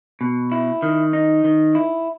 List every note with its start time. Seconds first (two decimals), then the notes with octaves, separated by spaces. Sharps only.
0.21 B2
0.52 E4
0.82 D#3
1.13 D#4
1.44 D#3
1.75 E4